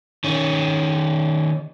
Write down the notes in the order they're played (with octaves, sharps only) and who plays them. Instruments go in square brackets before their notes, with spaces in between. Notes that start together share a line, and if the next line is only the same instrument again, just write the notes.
[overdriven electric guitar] D#3 C#4